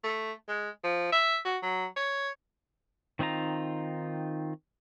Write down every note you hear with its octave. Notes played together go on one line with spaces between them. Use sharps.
A3
G#3
F3
E5
F#4
F#3
C#5
D#3 C4 D#4 F4 A#5